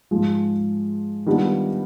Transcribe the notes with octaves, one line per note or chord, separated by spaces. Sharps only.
G#2 F3 G#3
D#3 G3 B3 D4 F4